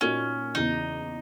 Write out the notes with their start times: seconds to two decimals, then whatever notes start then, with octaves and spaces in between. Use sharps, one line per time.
0.01 A#2 A#3 C#4 D#4 F#4
0.55 E2 C#3 E3 D#4